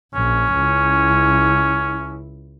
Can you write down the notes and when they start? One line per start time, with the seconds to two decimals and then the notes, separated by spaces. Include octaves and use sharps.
0.14 A#1 C#4
0.55 C#2 E4